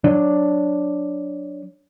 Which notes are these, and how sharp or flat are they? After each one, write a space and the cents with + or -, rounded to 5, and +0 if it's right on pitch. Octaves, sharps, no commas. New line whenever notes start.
F#3 +0 D4 +0